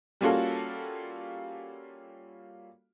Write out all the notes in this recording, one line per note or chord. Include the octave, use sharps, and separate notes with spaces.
G3 A#3 C#4 F4 F#4 A4